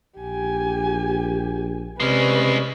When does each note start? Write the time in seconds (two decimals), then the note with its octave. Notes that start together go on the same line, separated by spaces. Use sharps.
0.18 A#1 G4 G#5
2.00 C3 G#3 C#4 B4 D5